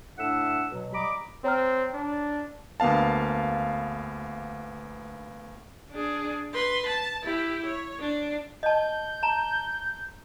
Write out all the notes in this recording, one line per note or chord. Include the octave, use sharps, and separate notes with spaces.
A2 D4 A4 E5 F#5 E6
B2 F#3
G3 D#5 A#5 B5 D6
C4 C#5 A#5 F6
D4
D2 A#3 B3 F5 A5
D4 G#4
B4 C6
A5
E4 G4
C#5
D4
D#5 A5 G6
A5 A#5